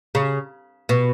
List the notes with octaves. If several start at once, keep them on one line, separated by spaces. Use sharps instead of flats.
C#3
B2